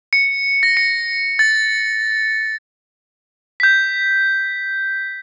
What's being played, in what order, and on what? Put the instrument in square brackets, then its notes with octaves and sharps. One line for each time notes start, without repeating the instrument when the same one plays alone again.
[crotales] C#7
A#6
C#7
A6
G6 B6